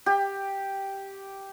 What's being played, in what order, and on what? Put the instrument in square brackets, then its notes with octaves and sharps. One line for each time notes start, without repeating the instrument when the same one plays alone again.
[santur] G4